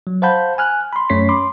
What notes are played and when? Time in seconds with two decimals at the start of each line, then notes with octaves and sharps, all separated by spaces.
0.07 F#3
0.22 C5 F5 F#5 A5 B5 G6
0.58 G#5 F6 F#6
0.93 B5 C6
1.09 F#2 A3 C#4 C#5 B6 C7
1.29 B5 C6 D6